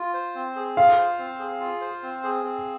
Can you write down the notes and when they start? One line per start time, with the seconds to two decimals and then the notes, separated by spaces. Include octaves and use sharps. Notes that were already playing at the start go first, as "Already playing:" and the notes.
Already playing: F4
0.14 C5
0.35 C4
0.56 G#4
0.76 F4 F5
0.98 C5
1.19 C4
1.40 G#4
1.60 F4
1.81 C5
2.03 C4
2.24 G#4
2.44 C4